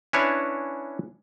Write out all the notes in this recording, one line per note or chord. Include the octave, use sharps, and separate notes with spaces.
C#4 D4 E4 B4 C#5